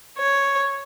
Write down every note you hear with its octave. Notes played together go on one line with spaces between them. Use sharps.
C#5